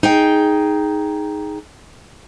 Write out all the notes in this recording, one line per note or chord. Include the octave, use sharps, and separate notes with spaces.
D#4 G#4 G5